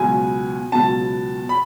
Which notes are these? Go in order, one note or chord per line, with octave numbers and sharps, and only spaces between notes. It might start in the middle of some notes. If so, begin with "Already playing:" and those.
Already playing: C#2 B2 F#3 G#5
C#2 B2 F#3 A5
B5